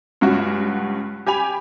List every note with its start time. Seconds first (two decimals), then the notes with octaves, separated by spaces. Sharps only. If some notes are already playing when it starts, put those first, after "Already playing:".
0.21 C#2 G2 C#4 F#4
1.26 G4 G#5 B5 F7